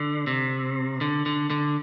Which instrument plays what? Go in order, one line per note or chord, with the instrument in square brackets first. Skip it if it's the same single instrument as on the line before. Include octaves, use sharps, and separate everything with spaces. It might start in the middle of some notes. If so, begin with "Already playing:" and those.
Already playing: [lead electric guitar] D3
C3
D3
D3
D3